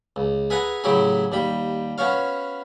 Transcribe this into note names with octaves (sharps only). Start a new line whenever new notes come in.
C#2
G#4 B4 E5 F#5 G#5 A#5
A2 C#3 F#3 E4 G4 G#4
D#2 G3 B5
B3 C#4 F#4 C#5 F5